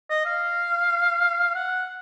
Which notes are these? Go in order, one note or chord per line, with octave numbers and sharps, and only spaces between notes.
D#5
F5
F#5